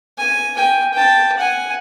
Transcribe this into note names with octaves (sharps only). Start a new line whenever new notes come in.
G#5
G5 G#5
G5 A5
F#5 G#5